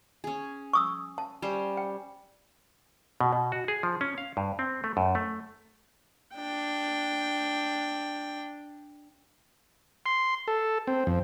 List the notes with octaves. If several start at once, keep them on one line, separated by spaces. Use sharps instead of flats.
C#4 G#4
C#6 D#6 E6
A5
G3 C#4 C5
G5
B2
B2
F#4
G#4
F3
C#4
F5
G2
C4
A3
F#2
A3
D4 G5
C6
A4
C4
F2